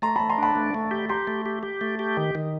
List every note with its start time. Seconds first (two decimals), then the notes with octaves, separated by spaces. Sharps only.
0.02 A3 A#5 C6
0.16 A3 A5 B5
0.30 A#5 C6
0.38 D4 A5 B5
0.55 A3
0.74 A3
0.91 G4
1.09 G4 A#5 C6
1.27 A3
1.46 G4
1.63 G4
1.81 A3
1.99 G4
2.17 D#3
2.35 D#3